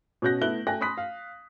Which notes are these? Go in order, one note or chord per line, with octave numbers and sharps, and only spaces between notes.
B2 C#4 F#4 F#6 G6 A#6
A3 B3 E4 F#6 G7
A3 G5 G#5 F#6 A#6
B5 C6 D#6 F#6 B6
F5